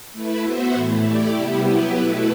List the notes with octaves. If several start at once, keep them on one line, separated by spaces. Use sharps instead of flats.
A3 E4 B4
B3 F#4 C5 E5
A2 E3 A3 E4
A3 E4 G4 D5
C3 G3 B3 E4 G4
F#3 B3 E4 G4 B4
B2 A3 E4 B4